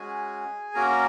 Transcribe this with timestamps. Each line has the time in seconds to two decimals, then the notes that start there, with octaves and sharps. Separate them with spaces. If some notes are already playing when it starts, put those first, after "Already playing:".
Already playing: G#3 C#4 F#4 G#4 G#5
0.75 A#3 C#4 F#4 A#4 A#5